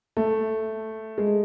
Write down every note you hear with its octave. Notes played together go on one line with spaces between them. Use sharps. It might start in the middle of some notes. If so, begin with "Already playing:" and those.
A3
G#3